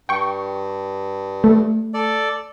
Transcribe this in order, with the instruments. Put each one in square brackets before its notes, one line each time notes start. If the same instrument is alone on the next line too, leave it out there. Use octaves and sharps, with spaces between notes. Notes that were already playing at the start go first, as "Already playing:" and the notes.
[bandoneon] G2 [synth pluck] G5 C#6
[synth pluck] A3
[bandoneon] A4 D5